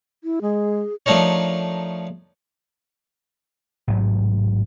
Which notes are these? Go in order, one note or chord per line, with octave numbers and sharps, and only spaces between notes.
E4
G#3 G#4
F3 A3 D4 D#4 A#4 C#5
A1 G#2 C3 F#3